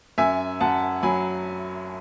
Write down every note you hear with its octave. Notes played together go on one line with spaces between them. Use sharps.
F#2 E5 G#5
F#2 F#5 A5
F#3 G#5 B5